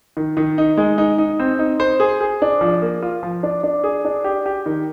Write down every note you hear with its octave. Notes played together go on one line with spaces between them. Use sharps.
D#3
D#3
D#4
G#3
D#4
D#4
C4
D#4
C5
G#4
G#4
D4
F3
A#3
F4
F3
D4
D4
G#4
D4
G4
G4
D#3